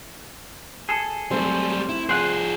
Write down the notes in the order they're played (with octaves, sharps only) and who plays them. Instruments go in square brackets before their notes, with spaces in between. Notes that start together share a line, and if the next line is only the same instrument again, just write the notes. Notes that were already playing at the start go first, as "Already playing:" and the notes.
[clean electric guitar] G#4 A4
[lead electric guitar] F#3 G3 [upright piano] A3 C4
[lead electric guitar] E4
[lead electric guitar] F3 G#4 [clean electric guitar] C5 F#5